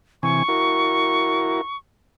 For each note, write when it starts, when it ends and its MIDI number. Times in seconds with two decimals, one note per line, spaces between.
0.23 0.43 48
0.23 0.43 52
0.23 0.43 80
0.23 1.77 85
0.49 1.61 64
0.49 1.61 66
0.49 1.61 70